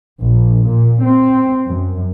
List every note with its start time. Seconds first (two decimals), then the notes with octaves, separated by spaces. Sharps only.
0.21 A#1
0.67 A#2
1.03 C4
1.67 F#2